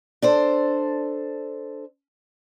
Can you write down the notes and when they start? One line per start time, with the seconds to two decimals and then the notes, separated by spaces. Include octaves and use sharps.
0.22 D4 A4 C5